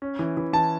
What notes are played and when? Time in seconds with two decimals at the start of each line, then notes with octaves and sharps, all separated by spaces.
0.02 C#4
0.19 E3
0.37 E3
0.53 E3 A5